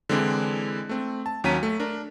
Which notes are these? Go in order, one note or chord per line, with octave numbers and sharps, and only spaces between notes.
D3 E3 G#3 C4 D4 E4
A3 C4
A5
D#2 F#3 C#4 A#5 B6 D#7
A3
D4 A#4